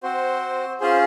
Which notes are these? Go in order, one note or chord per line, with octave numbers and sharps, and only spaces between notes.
C4 F#4 C5
C#4 F4 G#4 C5